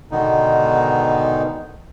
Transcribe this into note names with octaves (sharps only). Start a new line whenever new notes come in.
G#2 B2 D3 D#3 B3 D#4